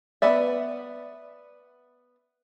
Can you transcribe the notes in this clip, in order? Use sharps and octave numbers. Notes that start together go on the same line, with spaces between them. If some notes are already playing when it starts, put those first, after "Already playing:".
B3 B4 D5 E5